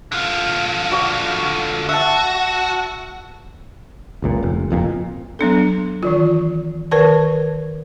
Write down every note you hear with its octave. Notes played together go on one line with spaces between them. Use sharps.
D3 F4
F#4 D5
F#4 E5 A5
F#1 C#2 A#2
F1
F#1 F2 A#2
F#3 B3 D4 A4
D#3 E3 F4
D#3 A#4 B4 A5